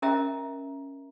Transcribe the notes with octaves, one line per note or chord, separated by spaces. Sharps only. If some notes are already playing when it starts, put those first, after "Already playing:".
C#4 A#4 D#5 E5 G5 A#5